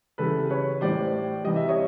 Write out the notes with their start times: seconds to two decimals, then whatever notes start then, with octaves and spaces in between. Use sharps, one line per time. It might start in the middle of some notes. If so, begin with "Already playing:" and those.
0.18 C#3 E3 G3 A4 B4
0.50 B4 C#5
0.81 A2 E3 G3 C5 D5
1.44 C3 E3 G3 D#5
1.56 E5
1.69 C#5 D#5